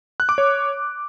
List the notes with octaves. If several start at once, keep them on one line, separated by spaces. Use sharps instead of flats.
F#6
D6
C#5